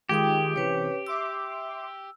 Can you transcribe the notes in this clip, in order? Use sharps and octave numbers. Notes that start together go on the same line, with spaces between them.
D#3 G#3 F4 G4 G#4 G5 D#6
C3 E3 C#4 B4 C#5
E5 C6 D6 E6